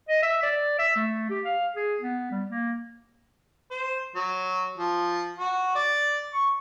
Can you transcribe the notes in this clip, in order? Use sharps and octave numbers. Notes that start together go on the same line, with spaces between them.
D#5
E5
D5
E5
A3
G4
F5
G#4
B3
G3
A#3
C5
F#3
F3
F#4
D5
C#6